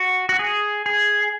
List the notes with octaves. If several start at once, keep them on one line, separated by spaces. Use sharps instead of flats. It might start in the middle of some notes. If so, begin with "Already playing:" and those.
Already playing: F#4
F#4
G#4
G#4